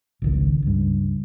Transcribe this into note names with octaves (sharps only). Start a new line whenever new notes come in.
G#1 C#2 D#3
C#2 G2